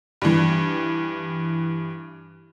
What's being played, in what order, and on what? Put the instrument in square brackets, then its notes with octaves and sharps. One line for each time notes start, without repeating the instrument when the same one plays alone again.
[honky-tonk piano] G2 E3